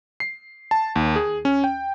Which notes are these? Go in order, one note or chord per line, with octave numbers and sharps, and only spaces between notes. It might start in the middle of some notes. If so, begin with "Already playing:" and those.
C7
A5
D#2
G#4
C#4
G5